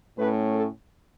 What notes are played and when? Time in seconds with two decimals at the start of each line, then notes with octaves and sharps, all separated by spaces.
0.17 A2 A3 C#4 B4
0.53 A4